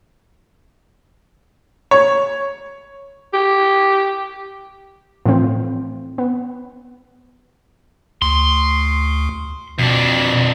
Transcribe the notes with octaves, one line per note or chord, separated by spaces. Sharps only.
C#5
G4
A2 E3 F3 C4
B3
D2 C6
F2 B2 D4